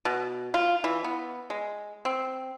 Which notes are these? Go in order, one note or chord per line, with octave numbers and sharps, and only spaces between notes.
B2
F4
E3
B3
G#3
C4